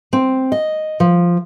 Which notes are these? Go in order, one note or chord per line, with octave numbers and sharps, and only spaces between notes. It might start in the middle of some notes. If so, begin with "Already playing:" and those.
C4
D#5
F3